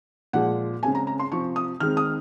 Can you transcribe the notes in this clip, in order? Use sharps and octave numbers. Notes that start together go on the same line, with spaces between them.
A#2 F3 G#3 F#5
C#3 G#3 C4 G#5
A#5
A#5
C6
C3 F3 C4 C#6
D#6
D#3 G#3 C4 F6
D#6